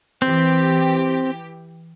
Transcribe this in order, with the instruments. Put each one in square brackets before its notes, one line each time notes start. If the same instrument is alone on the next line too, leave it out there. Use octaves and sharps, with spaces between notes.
[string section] E3 G4 [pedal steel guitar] C4